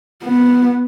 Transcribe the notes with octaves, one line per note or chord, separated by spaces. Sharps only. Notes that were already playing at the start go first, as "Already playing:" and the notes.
B3